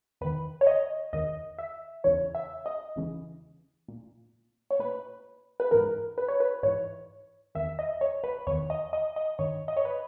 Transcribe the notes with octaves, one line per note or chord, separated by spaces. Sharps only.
E2 D#3 B4
C#5
D#5
E2 D#3 D#5
E5
E2 C#3 E3 C#5
E5
D#5
E2 C#3 E3
A#2
C#5
A#2 B4
B4
G#2 E3 A#4
B4
C#5
B4
G#2 E3 C#5
E2 D#3 E5
D#5
C#5
B4
E2 D#3 C#5
D#5
D#5
D#5
G2 D#3 C#5
D#5
C#5
B4